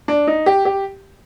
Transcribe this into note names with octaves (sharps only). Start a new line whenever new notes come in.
D4
D#4
G4
G4